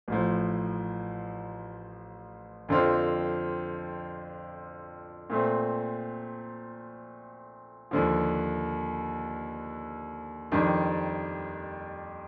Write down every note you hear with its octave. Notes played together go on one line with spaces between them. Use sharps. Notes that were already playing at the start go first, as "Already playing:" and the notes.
A1 A2 F3
F2 D3 F3 C4 F4
A#2 A3 C4
D#2 D3 F3
F2 D#3 G3 D4